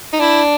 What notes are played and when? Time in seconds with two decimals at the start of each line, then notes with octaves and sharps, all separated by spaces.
0.13 D#4
0.20 D4 E4